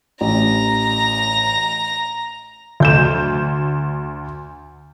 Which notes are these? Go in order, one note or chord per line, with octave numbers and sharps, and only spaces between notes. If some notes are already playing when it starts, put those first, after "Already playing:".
A1 A#5
D2 G6 E7